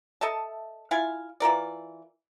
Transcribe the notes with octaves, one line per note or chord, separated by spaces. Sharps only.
A4 D#5 E5 A5
E4 F4 F5 G#5
E3 F4 A#4 D5